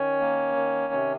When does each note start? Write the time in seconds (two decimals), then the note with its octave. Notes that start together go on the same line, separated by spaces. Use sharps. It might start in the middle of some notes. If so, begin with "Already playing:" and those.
Already playing: D#3 C#4 C#5
0.20 A#3
0.56 D#3
0.93 C3